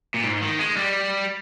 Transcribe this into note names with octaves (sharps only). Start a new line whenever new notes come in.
A#2
G#2
D#3
G#3
G3